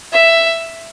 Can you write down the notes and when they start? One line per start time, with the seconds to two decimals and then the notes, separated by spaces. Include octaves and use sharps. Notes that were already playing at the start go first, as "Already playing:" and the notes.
0.13 E5